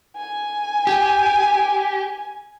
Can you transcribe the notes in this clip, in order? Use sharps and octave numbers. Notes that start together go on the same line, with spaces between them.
G#5
G4